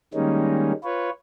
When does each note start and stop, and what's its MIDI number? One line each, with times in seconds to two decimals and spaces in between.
0.14 0.72 51
0.14 0.72 55
0.14 0.72 56
0.14 0.72 58
0.14 0.72 61
0.14 0.72 63
0.84 1.10 65
0.84 1.10 71
0.84 1.10 73